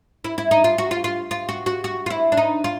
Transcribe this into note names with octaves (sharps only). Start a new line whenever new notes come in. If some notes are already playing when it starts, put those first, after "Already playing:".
E4
E4
D#4
F4
F#4
F4
F4
F4
F#4
F#4
F#4
F4
E4
D4
D#4
F4